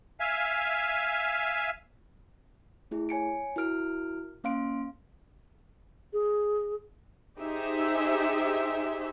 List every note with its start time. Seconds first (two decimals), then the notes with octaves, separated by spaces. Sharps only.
0.20 E5 F5 G#5
2.91 A3 E4 G#4
3.09 C#5 G#5 C#7 D7
3.56 E4 F#4 A#4 F6 D7
4.44 A#3 C#4 F5 C6 D7
6.13 G#4
7.39 D#4 G4 G#4 C5 E5